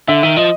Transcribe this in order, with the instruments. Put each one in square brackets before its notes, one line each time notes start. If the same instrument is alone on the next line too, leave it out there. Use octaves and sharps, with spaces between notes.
[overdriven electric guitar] D3 [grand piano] E5
[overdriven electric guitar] D#3 [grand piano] E5
[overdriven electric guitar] F3 [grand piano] D#5